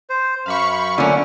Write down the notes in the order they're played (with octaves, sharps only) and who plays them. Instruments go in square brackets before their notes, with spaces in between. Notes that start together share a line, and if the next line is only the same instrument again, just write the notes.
[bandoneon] C5
[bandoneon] F#2 [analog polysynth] F5 B5 C#6
[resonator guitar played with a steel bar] D3 C#4 [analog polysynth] A3 A#3 F4